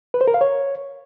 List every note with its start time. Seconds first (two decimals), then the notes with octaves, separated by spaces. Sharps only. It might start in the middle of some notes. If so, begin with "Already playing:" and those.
0.14 B4
0.21 C5
0.28 A#4
0.34 F5
0.41 C#5